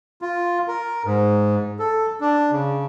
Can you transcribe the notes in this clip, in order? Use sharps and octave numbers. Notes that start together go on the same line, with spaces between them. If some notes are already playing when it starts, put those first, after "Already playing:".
F4
A#4
G#2
A4
D4
C#3